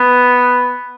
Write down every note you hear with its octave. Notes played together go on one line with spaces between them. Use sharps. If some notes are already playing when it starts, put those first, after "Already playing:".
Already playing: B3